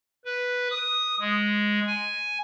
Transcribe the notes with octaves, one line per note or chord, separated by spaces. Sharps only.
B4
D#6
G#3
G#5